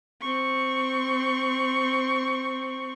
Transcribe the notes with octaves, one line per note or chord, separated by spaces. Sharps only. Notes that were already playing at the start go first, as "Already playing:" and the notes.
C4 C#6